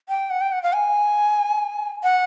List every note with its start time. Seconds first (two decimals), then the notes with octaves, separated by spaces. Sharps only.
0.09 G5
0.30 F#5
0.41 G5
0.52 F#5
0.63 F5
0.73 G#5
2.03 F#5